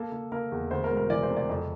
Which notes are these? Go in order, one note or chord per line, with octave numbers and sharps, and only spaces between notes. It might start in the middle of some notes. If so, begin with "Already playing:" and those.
Already playing: A#3 A4
A#3
A#3 A#4
E2
D2 C5
A#4
E1
A#4
E3 D5
C5
C3
D5
F2